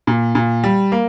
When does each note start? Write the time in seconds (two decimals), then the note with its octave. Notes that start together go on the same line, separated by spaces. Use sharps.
0.07 A#2
0.35 A#2
0.64 G3
0.92 A#3